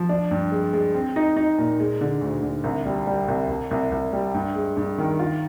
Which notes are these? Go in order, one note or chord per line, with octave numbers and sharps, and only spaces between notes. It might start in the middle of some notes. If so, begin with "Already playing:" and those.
Already playing: F3
D4
G2
G#3
G#3
C4
D#4
D#4
A#2
G#3
D3
D2
D3
C2
G3
G3
C2
C2
C2
C2
G3
G2
G#3
G2
D#3
F4